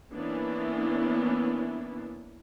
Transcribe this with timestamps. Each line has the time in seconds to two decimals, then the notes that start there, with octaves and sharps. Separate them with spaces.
0.13 E3 A#3 B3 C#4 D4 E4